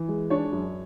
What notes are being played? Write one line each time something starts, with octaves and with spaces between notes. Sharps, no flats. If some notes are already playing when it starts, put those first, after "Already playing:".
Already playing: E3
G#3
D4 C#5
F#2